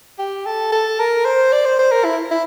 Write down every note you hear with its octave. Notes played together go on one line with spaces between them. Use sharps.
G4
A4
A4
A#4
C5
D5
C5
C5
A#4
E4
E4